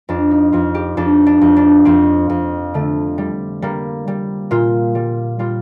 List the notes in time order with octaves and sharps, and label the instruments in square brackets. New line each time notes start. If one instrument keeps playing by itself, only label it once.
[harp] F2 D4
D#4
F2 F4
G4
F2 D4
D4
F2
D4
F2 C4
F2
D3 A3
G3
G3 A#3
G3
A#2 F4
G3
G3 F4